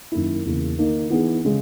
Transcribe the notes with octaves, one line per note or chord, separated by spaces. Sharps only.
F#2 D#3 A#3 E4
E2 C#3 E3 A#3
D#3 A#3 D#4
E3 B3 D#4 G#4
C#3 G#3